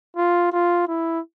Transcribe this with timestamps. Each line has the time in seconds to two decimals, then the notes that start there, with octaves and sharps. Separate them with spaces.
0.17 F4
0.52 F4
0.88 E4